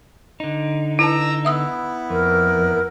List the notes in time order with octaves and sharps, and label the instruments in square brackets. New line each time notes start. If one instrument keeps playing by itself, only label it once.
[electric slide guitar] D3 D#4
[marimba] E4 B4 A5 [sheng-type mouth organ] A#5 E6
[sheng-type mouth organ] B3 E4 [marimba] E5 D#6 E6
[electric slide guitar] F2 [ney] A#4